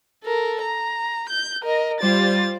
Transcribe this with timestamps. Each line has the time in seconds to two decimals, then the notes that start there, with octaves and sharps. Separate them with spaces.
0.23 A4 A#4
0.62 A#5
1.29 G6
1.63 A#4 D#5
2.00 G3 F4 C5 D5 A6